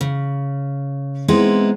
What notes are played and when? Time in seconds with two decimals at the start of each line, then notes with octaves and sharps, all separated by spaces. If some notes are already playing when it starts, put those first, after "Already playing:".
0.01 C#3
1.28 G#3 B3 C4 D#4 E4